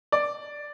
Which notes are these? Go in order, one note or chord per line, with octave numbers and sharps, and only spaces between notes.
D5